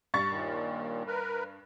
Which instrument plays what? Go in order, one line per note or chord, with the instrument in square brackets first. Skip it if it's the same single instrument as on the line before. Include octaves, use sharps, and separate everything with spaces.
[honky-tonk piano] G2 C#6 A6
[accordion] D#2 A#2 D#3
A#4 B4